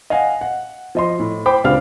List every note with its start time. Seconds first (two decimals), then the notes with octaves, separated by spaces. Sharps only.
0.10 D#5 F5 F#5 G#5
0.41 F#5
0.95 F3 D#5 C6
1.19 A2
1.46 C5 G5 B5 D6
1.64 C#2 C4 D4 G4 F5 F6